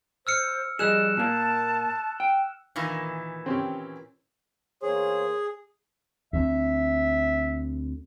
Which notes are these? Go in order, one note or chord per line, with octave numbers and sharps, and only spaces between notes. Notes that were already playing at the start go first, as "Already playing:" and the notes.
C5 E6 F6 C#7
F3 G3 G#4 D#5 E6 F#6 E7
A#2 A#3 A5
G5
A#2 D#3 E3
C4 C#4 G4
E2 A#3 G#4 C5 C#5
D2 C4 E5